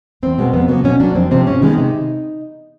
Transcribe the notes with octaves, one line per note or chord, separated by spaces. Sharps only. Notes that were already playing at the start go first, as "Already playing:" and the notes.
E2 C4
B2 G#3 B3
F2 B3
C#3 F#3 A#3 B3
B2 C#4
F#3 A#3 D4
F2 C4
C3 F3 C4
G#2 C#4
D#3 G#3 B3 D#4
C3